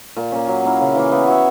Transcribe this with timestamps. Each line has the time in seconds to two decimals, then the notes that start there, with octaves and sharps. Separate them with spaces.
0.17 A#2
0.32 A#3 C#4
0.48 F#3
0.64 A#3 C#4 E4
0.80 C#3
0.95 E3 A#3
1.12 B3
1.27 F#4 C#5 E5